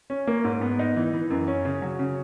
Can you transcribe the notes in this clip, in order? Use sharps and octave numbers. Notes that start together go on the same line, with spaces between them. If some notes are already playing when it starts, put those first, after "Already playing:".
C#4
A#3
G#2
B3
D#4
E3
E3
F#2
C#4
C#3
F#3
C#3